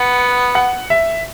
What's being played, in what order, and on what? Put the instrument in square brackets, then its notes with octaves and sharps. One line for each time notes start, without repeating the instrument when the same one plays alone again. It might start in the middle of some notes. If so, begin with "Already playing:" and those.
Already playing: [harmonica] B3 [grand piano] F#5
[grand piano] F#5
E5